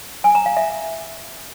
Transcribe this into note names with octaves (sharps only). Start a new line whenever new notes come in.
G#5
A#5
F5
E5